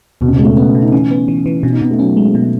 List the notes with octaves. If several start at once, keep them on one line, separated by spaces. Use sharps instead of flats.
D#2 B2
C#3
B2
G#3
A3
B3 C#4
B2
D#4
E3 C#4
B3
E3
E3
B2 C#4
D#4
B2 B3
A3
F#3 C#4
G#3
B2